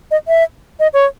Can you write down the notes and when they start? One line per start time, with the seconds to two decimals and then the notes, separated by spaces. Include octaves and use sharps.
0.11 D#5
0.28 E5
0.80 D#5
0.94 C#5